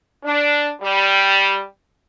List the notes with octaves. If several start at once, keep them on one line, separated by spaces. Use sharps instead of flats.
D4
G3